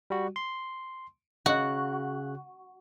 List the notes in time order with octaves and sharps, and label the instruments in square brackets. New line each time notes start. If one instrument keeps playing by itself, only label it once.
[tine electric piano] G3 F#4
C6
[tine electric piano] C#3 F#6 [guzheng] F#4